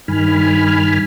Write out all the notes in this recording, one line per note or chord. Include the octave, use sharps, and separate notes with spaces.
G2 D#3 G#5 B5 F6